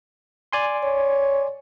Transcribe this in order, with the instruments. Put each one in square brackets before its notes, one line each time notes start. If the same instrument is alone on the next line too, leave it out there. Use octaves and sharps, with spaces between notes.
[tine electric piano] D5 G#5 C6
[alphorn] C#5